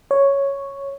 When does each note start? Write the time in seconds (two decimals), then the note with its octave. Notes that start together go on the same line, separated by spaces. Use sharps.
0.11 C#5